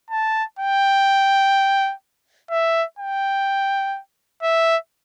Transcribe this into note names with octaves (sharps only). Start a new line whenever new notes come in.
A5
G5
E5
G5
E5